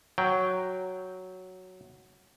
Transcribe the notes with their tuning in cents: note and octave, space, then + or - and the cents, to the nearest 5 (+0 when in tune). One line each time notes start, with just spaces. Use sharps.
F#3 +0 G5 +0